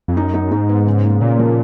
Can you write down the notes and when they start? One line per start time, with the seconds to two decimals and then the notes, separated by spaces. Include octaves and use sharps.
0.08 F2
0.16 F#2 D#4
0.34 D#4
0.51 G#2 D#4
0.69 B3
0.86 C#3
1.04 A#3
1.21 A#2 C#3
1.39 F3